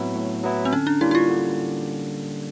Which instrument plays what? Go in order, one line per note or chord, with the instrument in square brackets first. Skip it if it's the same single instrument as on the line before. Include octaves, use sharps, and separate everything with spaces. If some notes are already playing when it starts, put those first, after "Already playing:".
Already playing: [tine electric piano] A2 F#3 B3 E4 [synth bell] C4
[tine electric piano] A2
F#3 B3 E4
[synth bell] C4
[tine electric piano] D3 [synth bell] C#4
[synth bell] D4
[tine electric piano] G3 A#3 C#4 [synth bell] E4
[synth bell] E4
F4
[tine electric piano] D3